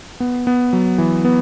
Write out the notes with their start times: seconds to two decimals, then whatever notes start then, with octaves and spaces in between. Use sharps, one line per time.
0.20 B3
0.47 B3
0.73 F#3
0.98 E3
1.25 B3